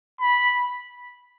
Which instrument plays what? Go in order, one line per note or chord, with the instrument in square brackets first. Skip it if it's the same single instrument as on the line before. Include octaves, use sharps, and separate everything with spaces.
[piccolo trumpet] B5